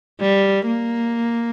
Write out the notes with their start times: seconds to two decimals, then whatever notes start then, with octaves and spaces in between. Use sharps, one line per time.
0.20 G3
0.66 A#3